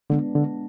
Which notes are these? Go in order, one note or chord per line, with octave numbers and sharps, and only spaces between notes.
D3 G#3 B3 D4
D3